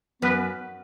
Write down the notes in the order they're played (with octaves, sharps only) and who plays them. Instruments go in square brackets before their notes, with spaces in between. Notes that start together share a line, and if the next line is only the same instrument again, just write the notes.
[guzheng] F#2 [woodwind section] B3 B4